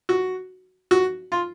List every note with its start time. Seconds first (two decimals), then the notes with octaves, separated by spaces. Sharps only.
0.09 F#4
0.91 F#4
1.32 F4